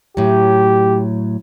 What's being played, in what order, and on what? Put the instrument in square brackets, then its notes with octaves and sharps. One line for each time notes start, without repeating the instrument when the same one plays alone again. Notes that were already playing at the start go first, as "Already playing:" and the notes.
[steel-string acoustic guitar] A2 F#3 [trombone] G4